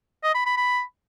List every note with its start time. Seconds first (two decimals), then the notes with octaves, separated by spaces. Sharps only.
0.23 D#5
0.35 B5
0.46 B5
0.57 B5